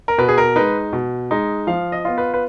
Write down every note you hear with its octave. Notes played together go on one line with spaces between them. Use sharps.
A#4
B2 B4
G#4
A#4
G#3 D#4 B4
B2
G#3 D#4
F3 F5
D#5
B3 F4
B4
B4